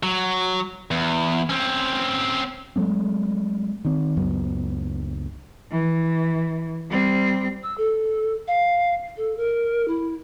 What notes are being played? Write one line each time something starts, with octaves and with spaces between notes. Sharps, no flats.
F#3
E2
C4 C#4
F#3 G#3 A3 C4
D#3 C4
C#2 F#2 F#3 B3
E3
G3 C4
E6
A4
F5
A4
A#4
E4